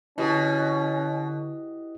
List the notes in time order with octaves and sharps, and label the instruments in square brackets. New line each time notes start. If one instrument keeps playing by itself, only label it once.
[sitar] B2 [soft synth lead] D3 [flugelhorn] C#4 [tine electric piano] E4 G4 D#5